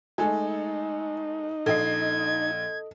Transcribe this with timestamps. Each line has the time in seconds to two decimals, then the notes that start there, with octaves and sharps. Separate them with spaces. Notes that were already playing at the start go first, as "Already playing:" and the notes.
0.18 G#3 A3 D#4 A4 G#5
1.66 A#1 A4 D#5 G#6 C7